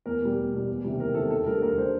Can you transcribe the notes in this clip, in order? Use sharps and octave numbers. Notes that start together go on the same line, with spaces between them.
E2 A#4
B2 G3
E2
B2 G3
E2
C3 D#3 G3
E2 A#4
C3 D#3 G3 A4
D#2 A4
D3 G3 A#4
D#2 A#4
D3 G3 C5